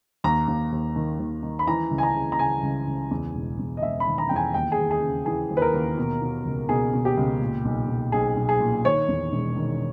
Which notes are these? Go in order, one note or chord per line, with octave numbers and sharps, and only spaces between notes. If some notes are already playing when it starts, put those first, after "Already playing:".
D#2 A#5
D#2
D#2
D#3
D#2
D#3
B5
E3 A#5
C#2
G#5
A#5
C#3
A#5
C#3 G#5
C#2
C#2
E2
E1
E2
D#5
E1 E5
B5
D#3
A#5
E2 G5
G#5
D#2 G5
G#4
D#2
G#4
C#3
E3 G#4
D#2
B4
A#4
D#2
B2
B2
C#2
B2 G#4
B2
G4
C#2
A#2
B1
B1
B1 G#4
B1
G#4
A#2
D#3 C#5
E2
E1
D#3